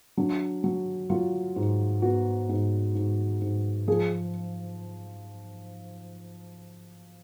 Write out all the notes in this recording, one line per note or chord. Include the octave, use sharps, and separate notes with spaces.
F#3 D4
F#3
F#3 F4
G#2
B3 F#4
G#2
G#2
G#2
F3 G#4